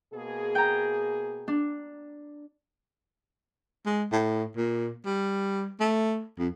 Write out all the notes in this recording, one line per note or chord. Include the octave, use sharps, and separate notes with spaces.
B2 A#3 G#4
G5 A#5
D4
G#3
A2
A#2
G3
A3
F2